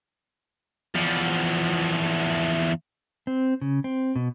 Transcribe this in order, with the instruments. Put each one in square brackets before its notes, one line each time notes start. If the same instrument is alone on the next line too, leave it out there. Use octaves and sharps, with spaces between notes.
[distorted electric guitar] E2 F3
[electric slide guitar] C4
C#3
C4
B2